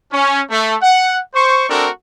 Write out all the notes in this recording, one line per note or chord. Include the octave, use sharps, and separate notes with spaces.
C#4
A3
F#5
C5 C#6
A3 C4 D4 F#4 A4 A#4